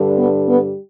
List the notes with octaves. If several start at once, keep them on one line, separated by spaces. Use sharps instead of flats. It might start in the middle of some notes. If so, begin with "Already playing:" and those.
Already playing: G2 D3 G3
B3
B3